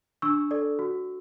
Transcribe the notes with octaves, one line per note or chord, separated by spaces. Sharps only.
D4 C#6 E6
A4 D5
F#4